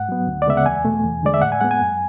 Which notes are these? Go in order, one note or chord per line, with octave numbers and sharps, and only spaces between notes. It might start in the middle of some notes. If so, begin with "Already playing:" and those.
Already playing: G#2 F#5
F#3 B3
D2
D5
C#3 G#3 B3 E5
F#5
E2 G#5
B2 A3
E2
D3 G#3 D5
E5
A2 F#5
G#5
G#3 B3 F#5
G#5
F#2